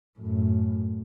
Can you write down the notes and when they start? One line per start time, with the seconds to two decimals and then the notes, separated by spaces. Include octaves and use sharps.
0.19 F#2 A2